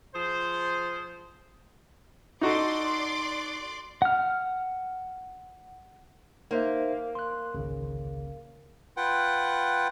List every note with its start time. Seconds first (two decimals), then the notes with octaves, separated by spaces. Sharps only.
0.15 F3 G#4 C5
2.41 D#4 F#4 A4 D5 C6 D6
4.02 F#5 F6
6.51 A#3 D#4 C5 E5
7.15 C6 F#6
7.54 G#1 C#2 C#3
8.97 F4 B4 F#5 G5